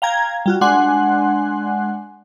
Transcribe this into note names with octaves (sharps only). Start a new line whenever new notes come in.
F5 G5 A#5 G#6
G3 F4 F#4
G#3 D4 F#5 G#5 C6 F#6